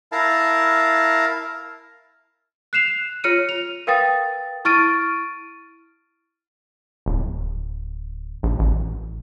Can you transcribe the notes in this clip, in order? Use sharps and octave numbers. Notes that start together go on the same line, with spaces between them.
E4 A#4 F5 A5
F#6 C7 E7 F7
F4 C#5 F6 C#7 D#7
F7
A#4 B4 F5 G5 D#6 A6
E4 C#6 F6 A6 D7 D#7
D1
A#1
A1